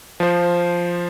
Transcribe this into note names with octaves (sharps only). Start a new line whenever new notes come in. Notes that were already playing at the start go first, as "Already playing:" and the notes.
F3 C5